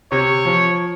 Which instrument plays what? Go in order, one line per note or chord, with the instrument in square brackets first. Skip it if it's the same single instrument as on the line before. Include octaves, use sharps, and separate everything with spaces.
[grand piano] C3 [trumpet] C#5
[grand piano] F3